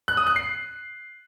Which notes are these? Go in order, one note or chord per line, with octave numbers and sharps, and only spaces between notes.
F#6
D#6
F#6
C7